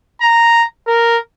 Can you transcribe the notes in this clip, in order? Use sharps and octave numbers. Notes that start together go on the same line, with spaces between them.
A#5
A#4